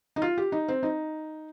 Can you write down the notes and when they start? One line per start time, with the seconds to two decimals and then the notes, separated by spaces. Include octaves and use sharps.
0.16 D#4
0.22 F4
0.38 G4
0.52 D#4
0.68 C4
0.83 D#4